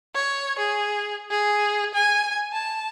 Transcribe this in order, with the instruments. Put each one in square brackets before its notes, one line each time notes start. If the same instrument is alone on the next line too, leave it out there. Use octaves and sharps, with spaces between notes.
[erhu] C#5
G#4
G#4
G#5
A5